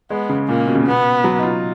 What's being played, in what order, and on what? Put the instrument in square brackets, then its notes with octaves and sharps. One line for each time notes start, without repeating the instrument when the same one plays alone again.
[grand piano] G#3 [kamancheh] B3
[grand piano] C#3
[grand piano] A#2 [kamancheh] A#3
[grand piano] B2
C#3
[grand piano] B2 [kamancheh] B3
[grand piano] F#3
D#4
F4